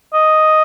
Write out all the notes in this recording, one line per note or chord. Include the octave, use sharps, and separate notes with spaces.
D#5